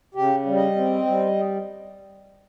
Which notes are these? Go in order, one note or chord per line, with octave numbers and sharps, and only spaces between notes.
C#3 G4
G3
D#5
C4
G3